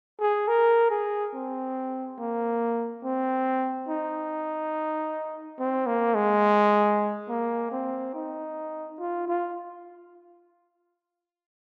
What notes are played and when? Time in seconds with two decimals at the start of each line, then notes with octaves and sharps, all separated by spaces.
0.20 G#4
0.48 A#4
0.90 G#4
1.34 C4
2.18 A#3
3.04 C4
3.89 D#4
5.59 C4
5.86 A#3
6.15 G#3
7.28 A#3
7.71 C4
8.14 D#4
8.99 F4
9.28 F4